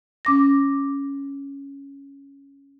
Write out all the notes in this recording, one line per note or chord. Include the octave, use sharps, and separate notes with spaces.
C#4 D6 A#6